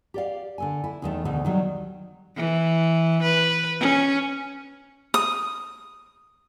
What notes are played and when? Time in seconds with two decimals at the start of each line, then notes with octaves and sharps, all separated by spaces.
0.14 G4 D5 F5
0.58 D3 A4 G#5
0.84 E4
1.02 E2 D#3 A3
1.25 D2 B2 E3 A3
1.45 D#3 F#3 G3
2.36 E3
3.22 B4
3.80 C#4
5.14 D#6